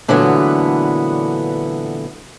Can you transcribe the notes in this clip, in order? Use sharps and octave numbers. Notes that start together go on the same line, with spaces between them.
A#2 D3 E3 F#3 A3 B3